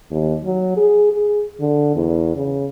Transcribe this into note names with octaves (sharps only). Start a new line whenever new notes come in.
D#2
F#3
G#4
G#4
D3
E2
C#3